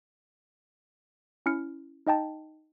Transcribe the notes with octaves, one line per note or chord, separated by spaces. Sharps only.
C#4 E4 F6 C#7
D#4 D#5 G5 A5